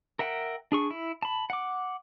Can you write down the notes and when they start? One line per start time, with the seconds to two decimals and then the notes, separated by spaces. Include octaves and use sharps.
0.19 A#4 E5 F#5 G5
0.72 D4 G#4 C#6
0.91 E4
1.22 A5 B5
1.50 F#5 D6